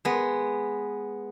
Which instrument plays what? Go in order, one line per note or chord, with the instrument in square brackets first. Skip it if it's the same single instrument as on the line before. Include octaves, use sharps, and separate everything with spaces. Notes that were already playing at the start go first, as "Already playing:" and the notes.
[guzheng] G#3 B3